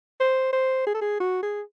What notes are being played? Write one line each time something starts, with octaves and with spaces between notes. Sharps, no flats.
C5
C5
G#4
A4
G#4
F#4
G#4